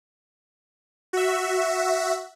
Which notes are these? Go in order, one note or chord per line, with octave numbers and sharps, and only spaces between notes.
F#4 E5